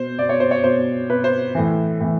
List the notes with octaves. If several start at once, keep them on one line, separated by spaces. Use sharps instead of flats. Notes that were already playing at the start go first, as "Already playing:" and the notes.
Already playing: B2 C5
B2 D5
C#5
C5
C#5
B2 C5
B2 B4
C5
A2 E3
A2 E3